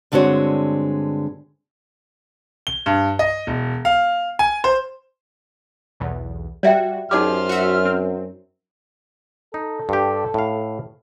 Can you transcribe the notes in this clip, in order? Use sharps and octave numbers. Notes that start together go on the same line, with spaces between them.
G2 D3 G#3 C4 F#4 C#5
G7
G2
D#5
E1
F5
G#5
C5
B1 E2
G3 F#4 D5 E5 G5
F#2 D#4 G4 G#4 C5 D5 D6 F6
F#4 E5
C4
D#4 A4
G2 G4
A2 F5